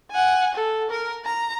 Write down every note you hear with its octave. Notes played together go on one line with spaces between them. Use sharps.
F#5 G#5
A4
A#4
A#5